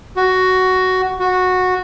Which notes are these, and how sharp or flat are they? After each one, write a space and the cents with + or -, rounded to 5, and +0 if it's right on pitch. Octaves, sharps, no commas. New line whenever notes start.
F#4 +10
F#4 -10